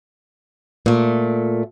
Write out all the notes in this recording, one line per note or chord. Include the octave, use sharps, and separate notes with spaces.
A#2 A3